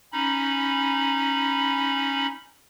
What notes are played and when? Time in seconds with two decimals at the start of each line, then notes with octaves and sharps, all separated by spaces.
0.13 C#4 D#4 B5